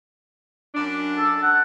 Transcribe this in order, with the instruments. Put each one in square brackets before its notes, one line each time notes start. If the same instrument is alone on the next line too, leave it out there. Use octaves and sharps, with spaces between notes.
[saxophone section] F#2 D4
[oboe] A4
F#5